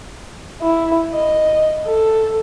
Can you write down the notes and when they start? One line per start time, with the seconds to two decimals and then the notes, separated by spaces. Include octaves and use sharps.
0.62 E4
1.12 D#5
1.86 A4